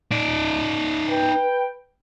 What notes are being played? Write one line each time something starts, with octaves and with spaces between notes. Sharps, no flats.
D#4 D5
B4 G5